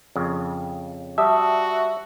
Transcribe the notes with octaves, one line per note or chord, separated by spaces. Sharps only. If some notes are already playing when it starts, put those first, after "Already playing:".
F2 C#3
G3 F#4 E5 A5 D#6